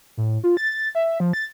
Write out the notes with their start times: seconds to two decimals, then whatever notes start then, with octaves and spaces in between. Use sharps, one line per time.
0.17 A2
0.44 F4
0.57 A6
0.95 E5
1.20 F3
1.33 A6